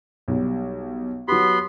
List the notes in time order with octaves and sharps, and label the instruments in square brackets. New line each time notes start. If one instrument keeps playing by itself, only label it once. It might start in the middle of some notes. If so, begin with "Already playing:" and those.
[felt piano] B1 G3
[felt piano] F#3 G4 [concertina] B3 B5 C6